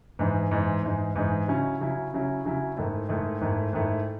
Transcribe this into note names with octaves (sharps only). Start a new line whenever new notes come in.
G#2 E3 G#3 D#4
G#2 E3 G#3 D#4
G#2 E3 G#3 D#4
G#2 E3 G#3 D#4
C#3 F#3 C#4 E4
C#3 F#3 C#4 E4
C#3 F#3 C#4 E4
C#3 F#3 C#4 E4
G#2 D#3 A3 E4
G#2 D#3 A3 E4
G#2 D#3 A3 E4
G#2 D#3 A3 E4